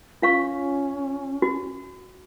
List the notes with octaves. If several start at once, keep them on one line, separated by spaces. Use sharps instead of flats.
C#4 F4 F5 C#6
F#4